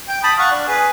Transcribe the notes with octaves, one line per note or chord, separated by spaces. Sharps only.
G5
A5 B5 D#6
F5 F#5 C#6
D4
G#4 B4